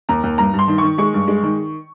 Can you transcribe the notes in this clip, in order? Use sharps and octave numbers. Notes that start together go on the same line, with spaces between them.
D#2 A#5
D#2
G2 A#5
G2
C6
D#3
D#3 C#6
G#3 C#6
G2
G#3
D#3